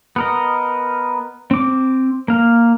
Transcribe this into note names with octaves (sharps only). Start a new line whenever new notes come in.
B3 A#4 D#5
C4 D6
A#3 F5